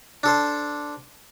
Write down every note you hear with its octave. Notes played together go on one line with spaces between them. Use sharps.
D4 A4 C5